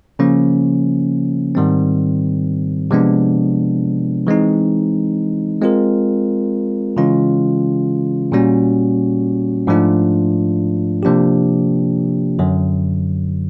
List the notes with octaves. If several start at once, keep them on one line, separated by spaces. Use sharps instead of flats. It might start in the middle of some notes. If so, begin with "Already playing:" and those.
C#3 F3 A#3 C#4
G#2 D#3 G3 C4
C3 F3 G#3 B3 D4
E3 G#3 C4 D#4
G#3 C4 F4 A#4
C#3 E3 G#3 C#4 F4
A#2 G3 A#3 C#4 F#4
G#2 F3 A3 D4 F4
C3 F3 A#3 D4 G4
F#2 D3 F#3